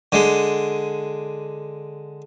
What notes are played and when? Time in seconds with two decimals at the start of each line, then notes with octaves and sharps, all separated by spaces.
0.12 D3 G#3